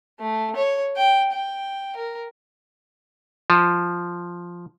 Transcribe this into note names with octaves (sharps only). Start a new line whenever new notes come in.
A3
C#5
G5
G5
A#4
F3